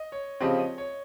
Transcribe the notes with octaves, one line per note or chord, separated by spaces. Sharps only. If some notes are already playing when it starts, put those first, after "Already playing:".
Already playing: D#5
C#5
C#3 F3 C4 G4 D#5
D#5
C#5